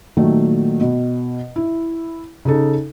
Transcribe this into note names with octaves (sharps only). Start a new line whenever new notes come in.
A#2 D#3 F#3 A3
B2
E4
C#3 D#4 A4